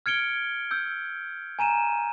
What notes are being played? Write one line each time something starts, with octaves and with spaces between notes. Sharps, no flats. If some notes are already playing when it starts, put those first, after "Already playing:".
F6 G#6 C#7 D7 G7
E6 G6
G#5 A#5 D#7 E7